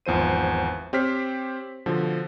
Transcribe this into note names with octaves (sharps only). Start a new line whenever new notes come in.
G#1 E2 F3 C5 D#7
C4 G4 C5 C#5 F6 B6
B2 D3 F3